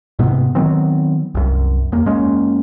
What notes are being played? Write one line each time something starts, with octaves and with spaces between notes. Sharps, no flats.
G#2 C3 B3
D#3 F#3 B3 C4
C2 F#2
E2 A#3
F#2 G#3 A#3 C#4